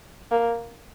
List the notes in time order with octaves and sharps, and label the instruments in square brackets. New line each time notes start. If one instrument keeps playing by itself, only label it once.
[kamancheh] A#3